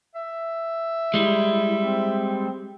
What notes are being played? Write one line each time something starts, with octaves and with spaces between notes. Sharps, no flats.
E5
G3 G#3 E4
C4